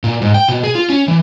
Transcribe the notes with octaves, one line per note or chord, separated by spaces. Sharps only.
A#2
G#2
G5
B2
G#4
F4
C#4
E3